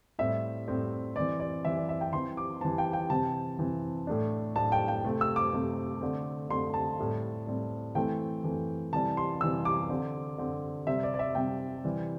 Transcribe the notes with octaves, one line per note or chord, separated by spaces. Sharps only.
A2 G3 C4 E5
A2 G3 C4
E3 C4 D5
D5
E3 C4 E5
D5
E5
G5
E3 C4 C6
D6
E3 C4 A5
G5
G5
C3 E3 C4 A5
C3 E3 C4
A2 A3 D4
A2 A3 D4 A5
G5
G5
C3 A3 C4
E6
D6
C3 A3 C4
D3 A3 C4
D3 A3 C4 C6
A5
A2 G3 C4
A2 G3 C4
E3 A3 C4 G5
E3 A3 C4
C3 E3 G3 A5
C6
C3 E3 G3 E6
D6
D3 C4
D3 C4
C3 G3 C4 E5
D5
D5
E5
C3 G3 C4 G5
C3 E3 G3 C4